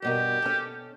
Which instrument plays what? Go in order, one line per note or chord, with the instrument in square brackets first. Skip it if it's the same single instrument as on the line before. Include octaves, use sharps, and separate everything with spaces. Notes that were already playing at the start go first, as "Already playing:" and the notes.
[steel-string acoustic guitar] G2 B2 A#4 [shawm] G4
[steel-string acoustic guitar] C#4 A4